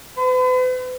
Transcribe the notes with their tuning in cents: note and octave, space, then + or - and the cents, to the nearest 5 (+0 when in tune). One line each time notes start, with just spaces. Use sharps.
B4 +45